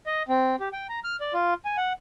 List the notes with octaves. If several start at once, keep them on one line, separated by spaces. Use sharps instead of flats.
D#5
C4
G4
G5
A#5
F6
D5
F4
G#5
F#5